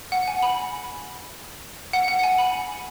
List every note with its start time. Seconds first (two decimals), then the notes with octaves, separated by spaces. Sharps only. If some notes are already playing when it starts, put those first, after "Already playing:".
0.12 F#5
0.28 G#5
0.43 B5
1.93 F#5
2.08 F#5
2.23 G#5
2.38 B5